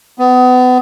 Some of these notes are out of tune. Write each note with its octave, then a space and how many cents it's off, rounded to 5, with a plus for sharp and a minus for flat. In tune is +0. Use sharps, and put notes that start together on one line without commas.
B3 +30